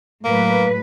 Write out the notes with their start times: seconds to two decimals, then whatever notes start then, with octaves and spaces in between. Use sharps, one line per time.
0.25 A2 F#3 A#3 B4